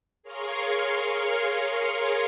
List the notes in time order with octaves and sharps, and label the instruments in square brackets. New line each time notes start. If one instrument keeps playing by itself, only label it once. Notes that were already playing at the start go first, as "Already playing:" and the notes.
[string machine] G#4 A#4 C#5 F5 C6 C#6